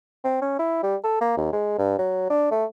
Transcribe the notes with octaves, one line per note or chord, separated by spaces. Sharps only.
C4
C#4
E4
G3
A4
A#3
D#2
G#3
G2
F#3
D4
A3